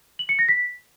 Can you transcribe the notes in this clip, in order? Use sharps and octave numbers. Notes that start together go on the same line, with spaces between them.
F#7
C#7
A#6
B6